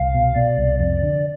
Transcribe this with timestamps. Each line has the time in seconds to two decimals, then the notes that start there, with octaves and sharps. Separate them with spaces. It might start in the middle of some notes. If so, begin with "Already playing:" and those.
Already playing: C2 F5
0.15 B2
0.36 B2 D5
0.57 C2
0.79 F2 D5
1.03 D3